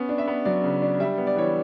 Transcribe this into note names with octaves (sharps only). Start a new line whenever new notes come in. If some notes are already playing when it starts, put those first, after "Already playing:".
Already playing: B3 C#4
D4
E5
B3
F#3 D5
C#3
D4
G3 E5
B3
D5
E3 C#5